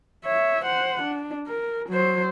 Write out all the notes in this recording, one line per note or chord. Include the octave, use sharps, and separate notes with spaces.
C#5 E5
C5 F#5
D4
A#4
F#3 C5